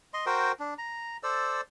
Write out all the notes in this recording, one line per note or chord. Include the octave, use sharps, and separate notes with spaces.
D#5 C6
F#4 A#4 C5 G5
D4
A#5
A4 C5 D5 E6